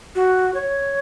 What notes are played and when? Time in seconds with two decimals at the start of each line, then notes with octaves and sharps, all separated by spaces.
0.15 F#4
0.54 C#5